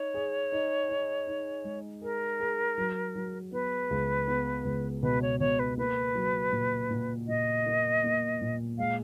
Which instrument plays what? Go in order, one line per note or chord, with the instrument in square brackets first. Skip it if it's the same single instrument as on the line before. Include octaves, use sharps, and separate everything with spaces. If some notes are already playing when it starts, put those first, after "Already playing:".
Already playing: [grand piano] D#4 [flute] C#5
[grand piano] G#4
D#4
D#4
D#4
G#3
[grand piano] G#4 [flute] A#4
[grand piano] G#4
F#3
F#3
[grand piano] B3 [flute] B4
[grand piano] C#2
B3
C#2
[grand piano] B2 [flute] B4
[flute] C#5
[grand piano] B2 [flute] C#5
[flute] B4
[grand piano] A#3 [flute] B4
[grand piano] F#3
A#2
A#2
[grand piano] A#2 [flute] D#5
[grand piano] A#3
A#3
A#2
[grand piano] G#3 [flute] F5